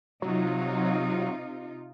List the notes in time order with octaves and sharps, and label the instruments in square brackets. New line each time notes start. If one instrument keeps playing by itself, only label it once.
[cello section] C3 D#4 F4 [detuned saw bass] F#3